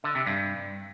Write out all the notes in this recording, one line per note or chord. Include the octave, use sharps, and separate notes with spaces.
D3
C3
G2